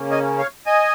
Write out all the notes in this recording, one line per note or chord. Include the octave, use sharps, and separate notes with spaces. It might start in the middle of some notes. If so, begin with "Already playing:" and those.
Already playing: C#3 A#3 C#4
D#5 G#5
C#5 F5
D#5 G#5